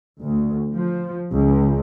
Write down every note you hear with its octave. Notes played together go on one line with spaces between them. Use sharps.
D2
F3
C#2